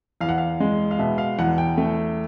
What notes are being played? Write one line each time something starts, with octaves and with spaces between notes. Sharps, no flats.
E2 F5
F#5
F5
G#3
F5
B2 E5
F5
E2 F#5
G5
A3